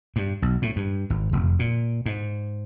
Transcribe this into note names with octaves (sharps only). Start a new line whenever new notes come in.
G2
B1
A2
G2
G#1
F1
A#2
G#2